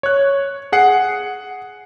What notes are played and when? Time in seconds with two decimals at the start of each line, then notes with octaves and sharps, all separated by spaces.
0.03 C#5 F#6
0.72 G#4 F#5 C7